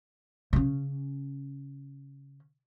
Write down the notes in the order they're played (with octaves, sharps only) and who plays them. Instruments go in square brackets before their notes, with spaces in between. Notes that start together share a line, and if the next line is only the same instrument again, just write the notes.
[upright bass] C#3 C#4